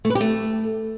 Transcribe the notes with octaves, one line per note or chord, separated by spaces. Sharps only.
A3
B4
G4
A3